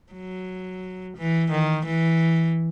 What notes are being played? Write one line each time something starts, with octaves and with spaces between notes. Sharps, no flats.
F#3
E3
D#3
E3